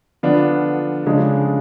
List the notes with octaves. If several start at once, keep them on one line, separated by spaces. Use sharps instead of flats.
D3 F3 B3 D4 F4
C#3 F3 G#3 D4